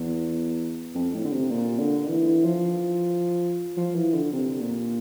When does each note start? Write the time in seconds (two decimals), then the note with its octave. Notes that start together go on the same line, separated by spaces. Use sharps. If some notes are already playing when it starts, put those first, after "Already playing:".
Already playing: E2
0.95 F2
1.14 A2
1.25 D3
1.32 C3
1.51 A#2
1.79 D3
2.08 E3
2.27 E3
2.45 F3
3.77 F3
3.95 E3
4.13 D3
4.33 C3
4.61 A#2